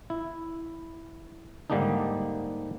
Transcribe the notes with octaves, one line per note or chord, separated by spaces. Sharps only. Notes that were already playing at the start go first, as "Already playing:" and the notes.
E4
G#2 D3 G3 A#3 D4 D#4